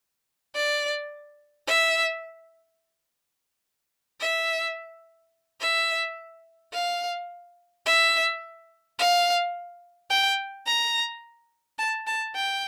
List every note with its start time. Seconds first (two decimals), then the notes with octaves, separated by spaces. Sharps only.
0.55 D5
1.67 E5
4.21 E5
5.61 E5
6.73 F5
7.86 E5
8.99 F5
10.10 G5
10.66 A#5
11.78 A5
12.07 A5
12.36 G5